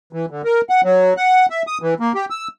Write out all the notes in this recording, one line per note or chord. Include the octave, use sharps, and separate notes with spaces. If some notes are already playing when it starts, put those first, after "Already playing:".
E3
D3
A#4
F#5
F#3
F#5
E5
D#6
E3
A#3
G4
E6